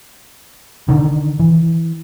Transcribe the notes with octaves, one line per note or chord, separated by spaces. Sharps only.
D3 D#3
E3